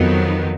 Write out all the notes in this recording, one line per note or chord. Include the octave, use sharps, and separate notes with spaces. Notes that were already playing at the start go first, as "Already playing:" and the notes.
Already playing: F2 D#3 F#3 B3 D#4